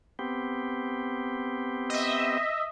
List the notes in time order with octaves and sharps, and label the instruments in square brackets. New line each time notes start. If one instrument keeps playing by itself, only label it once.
[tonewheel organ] B3 C4 G4
[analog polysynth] D#5 E5